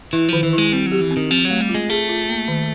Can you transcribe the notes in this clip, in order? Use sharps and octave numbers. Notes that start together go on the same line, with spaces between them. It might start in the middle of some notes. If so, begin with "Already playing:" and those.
E3 E4
D#3 F3
E3
G#3 E4
G3 C4
F#3
G4
E3
C4
D#3
F3 C4
F#3
A3
G3
F4
G#3
A3 G#4
F4
A#3
D#3